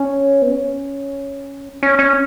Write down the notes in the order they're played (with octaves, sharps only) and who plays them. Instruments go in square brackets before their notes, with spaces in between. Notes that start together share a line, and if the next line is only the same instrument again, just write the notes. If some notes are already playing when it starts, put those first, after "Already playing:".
Already playing: [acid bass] C#4
B3
C#4
C#4
C#4